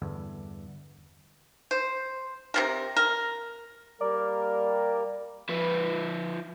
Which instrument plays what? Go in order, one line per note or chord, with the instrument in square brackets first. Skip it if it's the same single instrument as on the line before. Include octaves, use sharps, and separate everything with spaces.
[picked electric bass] E2 G2 D3
[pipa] C5
C3 F3 A#4
A#4
[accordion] G3 A#3 A#4 [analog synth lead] D5
[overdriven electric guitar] F3 B4